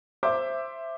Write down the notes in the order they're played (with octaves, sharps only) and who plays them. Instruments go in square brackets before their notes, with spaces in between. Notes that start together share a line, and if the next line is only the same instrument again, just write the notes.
[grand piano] C5 E5 D6